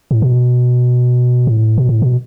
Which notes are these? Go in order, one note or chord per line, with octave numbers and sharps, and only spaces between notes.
A2
B2
A2
B2
A2
B2